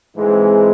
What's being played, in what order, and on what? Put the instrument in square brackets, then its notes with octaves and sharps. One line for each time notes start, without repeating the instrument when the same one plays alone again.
[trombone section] G#2 E3 G#3 C4